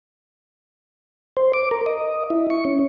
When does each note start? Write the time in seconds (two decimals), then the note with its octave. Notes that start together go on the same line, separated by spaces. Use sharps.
1.37 C5
1.53 D6
1.71 A#4
1.86 D#5
2.30 E4
2.50 C#6
2.65 C#4